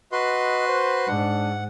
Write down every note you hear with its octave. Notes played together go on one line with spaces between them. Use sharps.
F#4 B4 D#5 C6
C5
G#2 D4 F#5